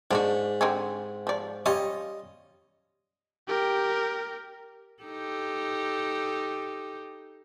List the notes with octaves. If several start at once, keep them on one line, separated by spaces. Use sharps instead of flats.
G#2 D4 F4 F#4
D3 C4 C#4
F3 D5
G3 C#4 F4 D#5
G4 A#4
D#4 G4 A4